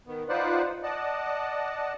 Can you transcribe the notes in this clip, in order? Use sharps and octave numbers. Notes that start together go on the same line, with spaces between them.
D#3 B3
D#4 F4 B4 C5 D5 F#5
D5 D#5 F#5 A5